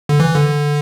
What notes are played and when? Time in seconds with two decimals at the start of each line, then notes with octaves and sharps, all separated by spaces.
0.09 D3
0.20 E3
0.35 D3